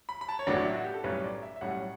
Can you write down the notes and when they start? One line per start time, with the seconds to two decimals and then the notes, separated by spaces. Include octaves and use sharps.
0.09 B5
0.21 B5
0.29 A5
0.39 C#5
0.47 A1 A2 F#3 B3 D4 D5
0.64 E4
0.74 F#4
0.84 G4
0.94 A4
1.04 B1 A2 G3 C#4 B4
1.24 D5
1.42 E5
1.56 E5
1.61 B1 A2 G3 C#4 F#5